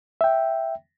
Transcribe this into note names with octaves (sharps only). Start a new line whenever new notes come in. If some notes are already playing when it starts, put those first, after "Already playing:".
E5 G5